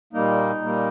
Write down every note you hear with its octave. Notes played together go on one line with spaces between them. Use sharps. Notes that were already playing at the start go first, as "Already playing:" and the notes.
A#2 G3 A#3 D#4
A#2 G3 A#3